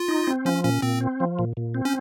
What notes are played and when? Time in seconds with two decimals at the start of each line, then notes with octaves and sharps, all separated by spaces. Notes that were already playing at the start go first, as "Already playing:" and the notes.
Already playing: F4
0.08 D#4
0.27 C4
0.45 F3 C#4
0.64 A#2 C#4
0.82 A#2 C4
1.01 C4
1.20 F3
1.39 A#2
1.57 A#2
1.75 C4
1.85 C#4